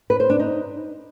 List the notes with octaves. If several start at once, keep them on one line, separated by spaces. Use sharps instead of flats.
B4
C5
D4
D#4